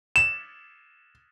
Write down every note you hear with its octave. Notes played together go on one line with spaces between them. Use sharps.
E7